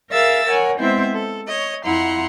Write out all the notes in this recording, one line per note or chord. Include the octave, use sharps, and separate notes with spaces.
G#4 A#4 E5 F5 E6 A6
A#4 C#5 F#5 G#5
G#3 B3 C4 E4 C5 E5
A4
C#5 D#5
F2 F3 E4 F#5 A#5 C6